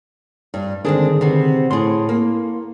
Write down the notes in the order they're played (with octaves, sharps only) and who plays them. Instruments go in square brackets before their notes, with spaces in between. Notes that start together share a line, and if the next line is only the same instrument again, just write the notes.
[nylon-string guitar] G2
[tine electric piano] D3 D#3 G#4 [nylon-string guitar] G#3 C4 D4
[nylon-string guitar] C3 B3 C4
[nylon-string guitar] A2 G#4 [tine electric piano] C6
[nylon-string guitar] A#3